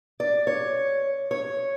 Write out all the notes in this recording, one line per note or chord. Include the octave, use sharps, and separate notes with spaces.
D5
C#5
C#5